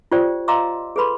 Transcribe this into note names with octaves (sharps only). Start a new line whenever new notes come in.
F4 G4 C5 D5 G5
D#5 F5 A#5 C6 D6 E6
G#4 A4 B4 B5 C6